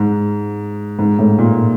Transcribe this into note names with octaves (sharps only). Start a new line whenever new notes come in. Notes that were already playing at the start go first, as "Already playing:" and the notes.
Already playing: G#2
G#2
A2
A#2